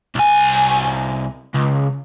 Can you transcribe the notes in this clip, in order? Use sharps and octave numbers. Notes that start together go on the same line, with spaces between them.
C2 G#5
C#2